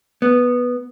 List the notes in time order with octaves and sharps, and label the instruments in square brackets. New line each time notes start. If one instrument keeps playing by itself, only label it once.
[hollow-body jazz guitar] B3